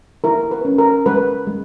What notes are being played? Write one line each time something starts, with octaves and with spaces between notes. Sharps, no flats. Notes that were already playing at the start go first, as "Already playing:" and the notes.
E4 A#4
B4
C#4
A#4
G#3 B4
G#3